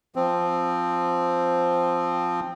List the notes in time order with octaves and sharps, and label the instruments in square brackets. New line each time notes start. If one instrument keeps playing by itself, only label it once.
[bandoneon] F3 C4